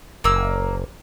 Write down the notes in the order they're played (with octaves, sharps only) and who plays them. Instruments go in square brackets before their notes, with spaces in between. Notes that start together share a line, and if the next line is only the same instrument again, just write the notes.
[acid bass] F#1 [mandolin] A#3 E6